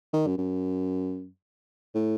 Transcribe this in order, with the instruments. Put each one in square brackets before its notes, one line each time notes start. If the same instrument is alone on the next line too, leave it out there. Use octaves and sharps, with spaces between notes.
[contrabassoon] D#3
F#2
F#2
A2